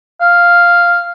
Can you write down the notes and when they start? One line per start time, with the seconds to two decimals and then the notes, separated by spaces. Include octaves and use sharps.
0.21 F5